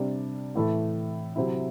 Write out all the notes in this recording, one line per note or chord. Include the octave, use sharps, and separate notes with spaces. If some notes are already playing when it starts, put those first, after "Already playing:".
Already playing: C3 G3 D4
A2 E3 A3 E4 A4
C3 F#3 C4 E4